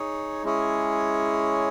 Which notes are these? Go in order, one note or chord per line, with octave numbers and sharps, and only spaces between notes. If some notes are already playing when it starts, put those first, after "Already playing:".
Already playing: D#4 G#4 C#5
G#3 C#4 E4 G#4 C#5